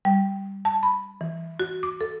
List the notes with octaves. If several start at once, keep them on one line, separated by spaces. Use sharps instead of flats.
G3
A5
B5
E3
F#4
D6
A4